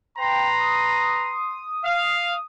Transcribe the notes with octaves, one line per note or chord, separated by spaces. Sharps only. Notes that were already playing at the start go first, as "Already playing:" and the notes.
B4 G5 A#5 C6
D#6
F5